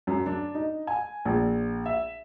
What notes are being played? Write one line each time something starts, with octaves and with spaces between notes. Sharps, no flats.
F#2
D4
D#4
G#5
A#1
E5